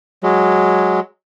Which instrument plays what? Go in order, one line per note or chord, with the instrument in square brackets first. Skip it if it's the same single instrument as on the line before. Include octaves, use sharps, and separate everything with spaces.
[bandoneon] F#3 G#3